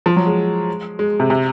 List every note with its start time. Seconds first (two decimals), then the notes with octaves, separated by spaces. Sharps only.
0.06 F3
0.16 F#3
0.27 G#3
0.99 G#3
1.20 C3
1.30 C3